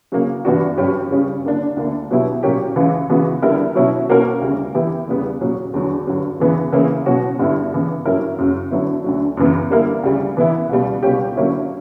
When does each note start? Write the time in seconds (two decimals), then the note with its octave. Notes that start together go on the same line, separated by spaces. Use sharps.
0.12 C#3 F#3 A#3
0.45 G2 E3 B3 D4 F#4
0.78 G2 F#3 C#4 G4
1.11 C#3 G3 C#4
1.44 D3 A#3 D4
1.77 D2 D3 A#3
2.11 B2 F#3 B3 E4 G4
2.43 A#2 F#3 A#3 C#4 G4
2.76 C#2 C#3 E3
3.10 C#2 C#3 E3 B3 F#4
3.42 D3 G3 B3 E4 A#4
3.75 B2 F#3 C#4 E4
4.09 B2 A#3 C#4 F#4 A#4
4.42 D2 C#3 G3
4.75 E3 B3 E4 G4
5.08 E2 C#3 G3 B3
5.41 A#2 F#3 C#4
5.74 E2 D3 F#3
6.07 G2 D3 F#3
6.40 E2 C#3 E3 B3
6.72 C#3 E3 A#3 C#4 E4
7.06 B2 F#3 C#4 F#4
7.39 G2 D3 G3 B3 E4
7.72 C#3 E3 B3
8.05 G2 F#3 C#4 E4 A#4
8.38 F#2 C#3 F#3
8.71 D3 F#3 B3 E4
9.04 D2 D3 F#3
9.37 F#2 C#3 E3 B3
9.70 D3 G3 A#3 E4 A#4
10.03 D2 C#3 G3
10.37 E3 B3 E4
10.69 C#2 B2 G3
11.03 C#2 B2 G3 C#4 G4
11.36 D3 F#3 A#3 C#4 E4